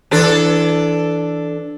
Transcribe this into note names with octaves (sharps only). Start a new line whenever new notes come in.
E3 D4 A4